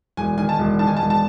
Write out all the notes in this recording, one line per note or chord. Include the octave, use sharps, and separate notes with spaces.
E1 G#5
D#3 G#5
A5
E1
D#3 A5
G#5
A5
E1
A5